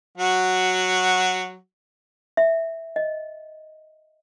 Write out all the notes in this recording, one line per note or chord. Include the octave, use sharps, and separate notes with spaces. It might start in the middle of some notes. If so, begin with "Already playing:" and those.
F#3 F#4
E5
D#5